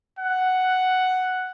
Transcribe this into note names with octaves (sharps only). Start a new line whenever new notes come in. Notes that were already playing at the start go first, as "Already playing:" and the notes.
F#5